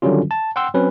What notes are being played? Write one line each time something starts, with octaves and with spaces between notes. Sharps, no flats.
D3 D#3 F#3 G3 C#4 F4
A5
F#5 G5 C6 E6
F#3 C4 C#4 B4